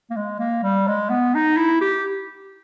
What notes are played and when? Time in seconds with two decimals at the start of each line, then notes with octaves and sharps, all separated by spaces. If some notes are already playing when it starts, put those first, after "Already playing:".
0.10 A#3
0.17 G#3
0.40 A#3
0.63 G3
0.88 G#3
1.10 B3
1.35 D#4
1.57 E4
1.81 G4